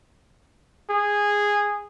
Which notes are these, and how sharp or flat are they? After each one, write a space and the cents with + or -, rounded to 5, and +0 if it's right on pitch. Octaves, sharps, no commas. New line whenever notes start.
G#4 -10